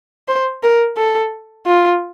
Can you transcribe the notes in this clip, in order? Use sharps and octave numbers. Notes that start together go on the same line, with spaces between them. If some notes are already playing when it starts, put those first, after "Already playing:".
C5
A#4
A4
F4